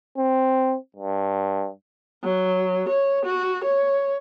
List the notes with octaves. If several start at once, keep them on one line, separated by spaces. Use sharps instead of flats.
C4
G2
F#3
C#5
F#4
C#5